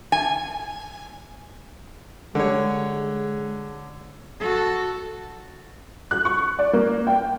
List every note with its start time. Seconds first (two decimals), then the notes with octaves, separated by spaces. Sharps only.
0.12 G#5
2.35 D3 G3 G#3 C#5
4.40 F#4 A4
6.11 F#6
6.25 C#6
6.59 D5
6.73 A#3
7.07 G5